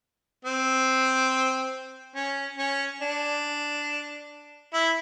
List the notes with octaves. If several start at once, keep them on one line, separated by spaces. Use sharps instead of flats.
C4
C#4
C#4
D4
E4